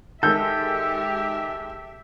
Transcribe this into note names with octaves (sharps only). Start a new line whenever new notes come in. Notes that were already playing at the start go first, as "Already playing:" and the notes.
D#3 G#3 G4 A4 E5 G6